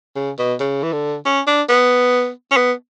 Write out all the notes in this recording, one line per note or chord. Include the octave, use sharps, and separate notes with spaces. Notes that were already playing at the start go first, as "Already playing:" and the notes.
C#3
B2
C#3
E3
D3
C#4
D4
B3
C#4
B3